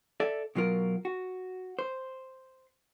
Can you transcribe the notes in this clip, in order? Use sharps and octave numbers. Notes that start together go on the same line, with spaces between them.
A4 D5 E5
B2 F#3 F4 A#4
F#4
C5